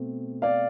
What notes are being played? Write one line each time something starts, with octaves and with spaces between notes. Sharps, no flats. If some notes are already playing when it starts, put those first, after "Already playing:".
Already playing: B2 A3 C4
D5 F5